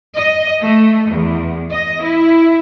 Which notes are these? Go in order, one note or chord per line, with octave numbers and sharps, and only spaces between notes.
D#5
A3
E2
D#5
E4